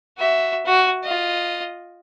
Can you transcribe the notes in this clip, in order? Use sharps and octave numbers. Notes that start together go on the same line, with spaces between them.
F#4 E5
F#4
F4 D#5